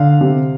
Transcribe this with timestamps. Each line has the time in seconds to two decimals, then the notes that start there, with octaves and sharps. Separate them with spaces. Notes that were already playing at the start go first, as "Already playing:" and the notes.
Already playing: D3 F5
0.21 C3